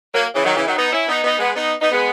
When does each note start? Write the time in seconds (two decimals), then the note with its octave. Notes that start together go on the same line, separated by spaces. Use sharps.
0.13 F#3 A#3
0.34 C#3 E3
0.45 D#3 F#3
0.55 C#3 E3
0.67 D#3 F#3
0.76 B3 D#4
0.92 C#4 E4
1.08 B3 D#4
1.23 B3 D#4
1.39 G#3 B3
1.55 B3 D#4
1.81 B3 D#4
1.92 G#3 B3